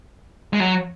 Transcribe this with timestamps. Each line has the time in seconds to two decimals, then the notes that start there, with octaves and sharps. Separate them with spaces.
0.53 G#3
0.60 F#3